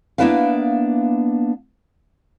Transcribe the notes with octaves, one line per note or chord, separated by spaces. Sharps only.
A#3 B3 D4 E4 B4 F5